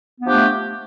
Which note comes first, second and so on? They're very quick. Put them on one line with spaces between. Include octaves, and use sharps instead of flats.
B3 D4 F3 G4 A3